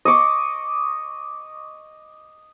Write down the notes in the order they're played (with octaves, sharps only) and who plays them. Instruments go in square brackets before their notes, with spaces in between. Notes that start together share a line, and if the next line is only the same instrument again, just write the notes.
[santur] D#5 C#6 D6